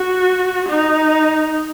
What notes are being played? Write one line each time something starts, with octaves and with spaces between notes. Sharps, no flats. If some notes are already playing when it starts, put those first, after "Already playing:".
Already playing: F#4
D#4